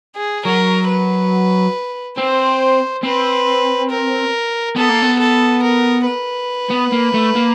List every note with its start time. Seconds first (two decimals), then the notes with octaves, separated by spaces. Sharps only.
0.16 G#4
0.45 F#3 A#4
0.88 B4
2.17 C4 C5
3.03 C4 B4
3.90 A#4
4.76 B3 A4
4.89 A#3
5.03 B3
5.19 A4
5.63 A#4
6.06 B4
6.70 B3
6.92 A#3
7.14 A3
7.35 A#3